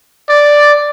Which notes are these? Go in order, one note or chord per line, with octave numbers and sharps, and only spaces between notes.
D5